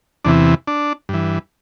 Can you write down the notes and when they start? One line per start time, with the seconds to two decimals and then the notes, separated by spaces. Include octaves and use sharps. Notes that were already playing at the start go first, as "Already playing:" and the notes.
0.25 E2 C3 E3 D4
0.68 D4
1.09 G2 E3